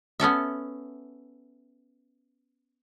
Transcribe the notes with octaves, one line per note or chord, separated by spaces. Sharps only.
B3 C#4 A4 E5